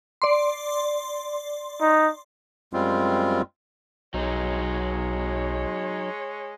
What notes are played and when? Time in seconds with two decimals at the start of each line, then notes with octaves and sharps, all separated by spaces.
0.22 D5 C6
1.81 D#4
2.73 F#2 G3 G#3 C4 F4
4.14 B1 F#3 G#3 D#4 C#5